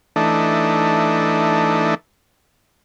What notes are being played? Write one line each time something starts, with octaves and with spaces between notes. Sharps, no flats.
E3 A3 D4 D#4